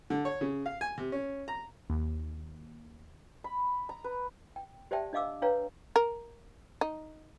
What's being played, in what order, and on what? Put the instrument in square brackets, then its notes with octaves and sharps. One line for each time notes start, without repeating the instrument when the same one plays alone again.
[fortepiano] D3
C#5
C#3
F5
G#5
C3
C#4
A#5
[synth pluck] D#2
[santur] B5
A#5
B4
[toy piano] G5
G4 C5 D5 E5 G5 A5
D4 D#5 F5 D6 E6
D4 B4 C#5 F5 G5 A#5
[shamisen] A#4
D#4